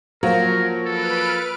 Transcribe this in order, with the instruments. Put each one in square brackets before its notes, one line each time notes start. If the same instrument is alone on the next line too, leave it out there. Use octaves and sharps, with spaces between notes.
[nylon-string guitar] F3 A#3 [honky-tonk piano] F#3 [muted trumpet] A#4
[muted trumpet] A4 [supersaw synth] B4 F6 D7